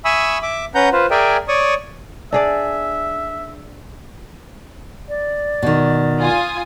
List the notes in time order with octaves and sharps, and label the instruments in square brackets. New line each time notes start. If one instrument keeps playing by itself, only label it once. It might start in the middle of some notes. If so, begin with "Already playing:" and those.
[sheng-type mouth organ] E5 G#5 B5 C#6 D#6 E6
E5 D6
C#4 B4 F#5 A#5 G6
F4 B4 C5
G#4 A#4 D5 E5 G5 G#5
C#5 D5 C#6 D#6
[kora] D4 G#4 D5 [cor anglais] E5
[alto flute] D5
[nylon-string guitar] B2 D#3
[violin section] F4 G#5 D#6